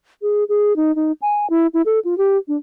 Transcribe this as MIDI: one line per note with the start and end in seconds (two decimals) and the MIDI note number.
0.22 0.44 68
0.49 0.76 68
0.76 0.94 63
0.95 1.12 63
1.22 1.47 80
1.50 1.67 64
1.74 1.82 64
1.86 1.99 69
2.05 2.17 65
2.18 2.37 67
2.48 2.57 62